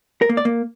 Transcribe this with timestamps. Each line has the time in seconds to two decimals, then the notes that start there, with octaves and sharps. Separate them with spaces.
0.22 A#4
0.29 A#3
0.37 D5
0.45 A#3